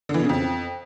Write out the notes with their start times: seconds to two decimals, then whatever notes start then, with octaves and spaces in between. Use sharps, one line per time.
0.09 D3
0.14 E3
0.19 B2
0.24 C#3
0.29 F2